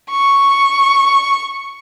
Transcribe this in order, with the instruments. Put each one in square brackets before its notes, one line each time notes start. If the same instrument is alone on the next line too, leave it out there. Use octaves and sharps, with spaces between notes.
[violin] C#6